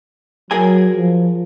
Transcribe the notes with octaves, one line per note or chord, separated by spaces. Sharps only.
F#3 G#4 A#4 G#5
F3